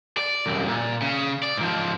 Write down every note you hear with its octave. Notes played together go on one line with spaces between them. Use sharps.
D5
C2 F#2
A#2
C#3
D5
G#2 F3